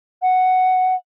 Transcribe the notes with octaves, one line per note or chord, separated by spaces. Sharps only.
F#5